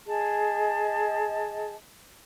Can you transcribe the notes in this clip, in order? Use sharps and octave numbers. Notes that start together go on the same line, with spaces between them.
G#4 D#5 A5